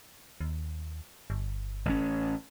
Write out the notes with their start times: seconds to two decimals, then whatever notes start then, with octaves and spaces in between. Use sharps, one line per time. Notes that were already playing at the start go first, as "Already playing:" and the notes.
0.41 D#2
1.30 G1
1.85 A1 C#4